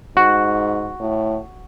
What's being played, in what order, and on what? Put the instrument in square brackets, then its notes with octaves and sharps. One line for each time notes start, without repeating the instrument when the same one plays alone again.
[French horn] G#2 [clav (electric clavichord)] F#4
[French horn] A2